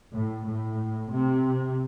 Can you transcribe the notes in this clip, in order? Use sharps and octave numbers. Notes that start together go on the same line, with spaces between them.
A2
A2
C3